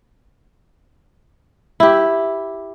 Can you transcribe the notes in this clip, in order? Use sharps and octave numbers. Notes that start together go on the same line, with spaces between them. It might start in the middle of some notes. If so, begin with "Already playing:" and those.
E4 G4